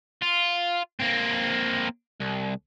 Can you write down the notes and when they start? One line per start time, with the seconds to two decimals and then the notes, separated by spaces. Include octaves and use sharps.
0.22 F4
1.00 A#3 C4
2.20 C2